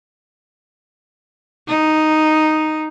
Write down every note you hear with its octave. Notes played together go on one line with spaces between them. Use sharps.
D#4